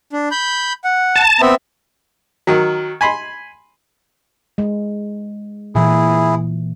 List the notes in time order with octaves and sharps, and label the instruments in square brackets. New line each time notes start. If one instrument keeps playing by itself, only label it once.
[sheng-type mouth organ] D4
B5 G6
F#5
[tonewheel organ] A5
[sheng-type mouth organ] B3 C4 E5
[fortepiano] D#3 F#3
G#5 B5 C6
[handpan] G#3
[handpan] A#2 E3 [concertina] E4 G#4